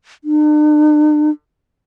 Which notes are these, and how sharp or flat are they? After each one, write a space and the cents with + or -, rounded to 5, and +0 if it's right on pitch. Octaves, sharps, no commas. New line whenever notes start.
D4 +45